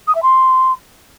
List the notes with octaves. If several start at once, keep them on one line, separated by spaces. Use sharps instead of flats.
D#6
E5
C6